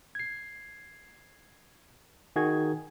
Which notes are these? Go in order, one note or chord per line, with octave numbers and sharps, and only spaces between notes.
G#6 C7
D#3 F#4 G#4 G#6